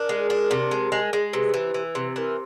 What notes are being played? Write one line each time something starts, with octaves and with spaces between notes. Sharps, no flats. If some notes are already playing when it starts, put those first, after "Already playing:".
Already playing: D4 A#4
G#3
D4
C3
G#3
G#3
G#3
C3 B4
E3
E3
C3
E3 A#4